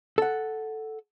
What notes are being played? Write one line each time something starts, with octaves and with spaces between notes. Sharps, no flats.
A4 F#5